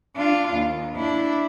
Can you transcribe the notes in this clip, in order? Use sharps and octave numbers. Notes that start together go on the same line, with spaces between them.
D4 F4
D#2
D4 E4